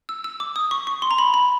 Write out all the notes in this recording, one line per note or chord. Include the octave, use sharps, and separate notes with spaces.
E6
E6
D6
D#6
C#6
C#6
C6
A#5
B5
B5